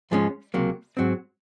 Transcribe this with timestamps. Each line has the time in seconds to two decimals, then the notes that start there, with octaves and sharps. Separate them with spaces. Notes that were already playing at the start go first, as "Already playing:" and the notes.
0.11 G#2 F3 G#3 C#4
0.54 C#2 C3 F#3 A#3
0.97 G#2 F#3 C4